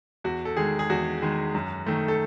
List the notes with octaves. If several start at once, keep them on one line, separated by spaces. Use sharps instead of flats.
E2 F#4
A4
D#3 G#3 G#4
G#4
E2 F#4
D#3 G#3
F#2
D#3 A3
A4